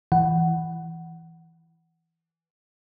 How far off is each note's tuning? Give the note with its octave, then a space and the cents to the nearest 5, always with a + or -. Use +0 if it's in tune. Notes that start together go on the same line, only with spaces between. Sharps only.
E3 +0 F#5 +10